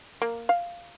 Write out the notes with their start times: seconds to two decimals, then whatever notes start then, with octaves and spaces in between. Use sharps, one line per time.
0.22 A#3
0.49 F5